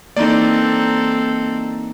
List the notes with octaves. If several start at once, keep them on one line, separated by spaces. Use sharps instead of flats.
E3 A#3 C4 D#4 A4 D5